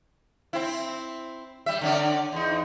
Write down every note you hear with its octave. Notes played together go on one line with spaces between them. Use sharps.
C4 E4
G3 E5
D3 C#4 D5
E2 D#4